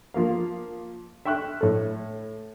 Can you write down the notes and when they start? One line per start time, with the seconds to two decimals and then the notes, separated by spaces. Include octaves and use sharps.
0.14 F3 A#3 F5
1.25 E5 G5 C#6 F6 F#6
1.61 A2 A4